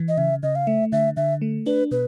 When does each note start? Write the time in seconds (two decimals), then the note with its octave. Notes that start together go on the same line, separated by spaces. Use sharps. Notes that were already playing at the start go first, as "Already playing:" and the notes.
Already playing: E3
0.08 D#5
0.18 C#3 E5
0.43 C#3 D#5
0.55 F5
0.67 A3 E5
0.92 D3 E5
1.17 D3 E5
1.41 A3
1.66 D4 B4
1.91 B2 B4